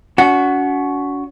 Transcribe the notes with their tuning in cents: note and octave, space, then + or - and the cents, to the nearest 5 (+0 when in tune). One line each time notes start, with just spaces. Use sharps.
C#4 +45 F#4 +0